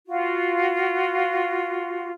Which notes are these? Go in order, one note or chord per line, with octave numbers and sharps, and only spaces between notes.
F4 F#4